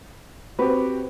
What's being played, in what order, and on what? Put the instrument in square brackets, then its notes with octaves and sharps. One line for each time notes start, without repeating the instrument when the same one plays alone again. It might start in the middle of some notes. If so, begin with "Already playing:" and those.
[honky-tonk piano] C4 [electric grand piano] F#4 G4 [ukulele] B4